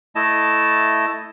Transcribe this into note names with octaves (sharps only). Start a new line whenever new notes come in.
A3 E4 D#5 A5